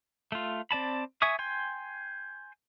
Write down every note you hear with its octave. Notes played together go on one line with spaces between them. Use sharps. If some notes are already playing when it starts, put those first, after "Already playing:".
A3 F4
C4 D5 A5 B5
E5 G#5 C#6 D#6
G5 G#5 C6